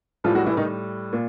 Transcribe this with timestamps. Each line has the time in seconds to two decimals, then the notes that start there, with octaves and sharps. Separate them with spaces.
0.24 A2 E3 F3 G3 F4
0.35 F#3 F#4
0.46 E3 E4
0.57 D#3 D#4
1.13 A#2